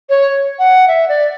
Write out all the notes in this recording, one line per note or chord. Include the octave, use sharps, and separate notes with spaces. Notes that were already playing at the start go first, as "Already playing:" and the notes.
C#5
F#5
E5
D5